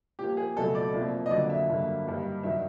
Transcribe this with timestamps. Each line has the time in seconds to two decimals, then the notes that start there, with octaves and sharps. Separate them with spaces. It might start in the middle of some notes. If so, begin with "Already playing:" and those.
0.19 A#2 F3 A#3 G4
0.37 G#4
0.56 C#2 B2 F#3 A3 A4
0.75 D5
0.94 C2 A#2 F3 A#3
1.26 D#5
1.31 F2 D3 F#3 A#3 D5
1.50 E5
1.69 G2 D3 F#3 A#3
2.06 G2 D#3 G3 A#3
2.43 G2 D#3 F#3 E5